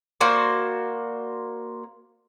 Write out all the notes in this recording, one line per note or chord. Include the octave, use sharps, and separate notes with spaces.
A#3 F#4 C5 D5